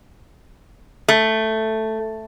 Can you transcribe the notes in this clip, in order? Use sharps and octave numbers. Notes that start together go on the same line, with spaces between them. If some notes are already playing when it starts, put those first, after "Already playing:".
A3